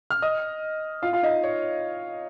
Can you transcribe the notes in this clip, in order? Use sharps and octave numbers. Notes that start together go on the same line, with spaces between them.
F6
D#5 D#6
F4 F5
F4 F5
D#4 D#5
C#5